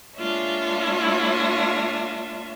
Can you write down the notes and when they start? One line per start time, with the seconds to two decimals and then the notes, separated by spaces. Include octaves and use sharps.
0.16 G#3 A#3 D4 F4 C#5 E5